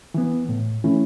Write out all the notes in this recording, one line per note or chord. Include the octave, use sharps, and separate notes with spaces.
E3 B3
A2
E3 A3 C#4 E4